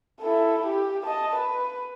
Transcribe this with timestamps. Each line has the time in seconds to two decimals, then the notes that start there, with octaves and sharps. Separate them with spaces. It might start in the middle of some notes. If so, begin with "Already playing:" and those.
0.21 E4 A4
0.67 G4
1.06 D#5 A5
1.36 B4